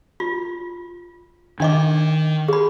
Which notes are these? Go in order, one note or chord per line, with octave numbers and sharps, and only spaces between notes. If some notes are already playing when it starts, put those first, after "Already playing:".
F4
D#3 D4 D#5 D6
G#4 B5